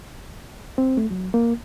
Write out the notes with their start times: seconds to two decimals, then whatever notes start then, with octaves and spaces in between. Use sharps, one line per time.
0.78 C4
0.97 A3
1.11 F#3
1.34 A#3